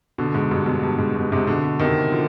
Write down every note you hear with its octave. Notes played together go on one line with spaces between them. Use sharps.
B2 D3
G#2
G2 B2
G2 B2
G2
G#2
G2 B2
G#2 C3
B2 D3
C3 D#3
D3 F3